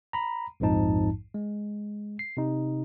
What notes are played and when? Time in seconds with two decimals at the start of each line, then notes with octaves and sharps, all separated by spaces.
0.13 A#5 B5
0.60 A#1 F2 G#2 F3 D#4 A5
1.34 G#3
2.19 C7
2.37 C3 D#4